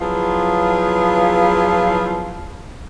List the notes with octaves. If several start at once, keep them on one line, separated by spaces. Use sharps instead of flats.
F3 F#3 B3 E4 F4 G#4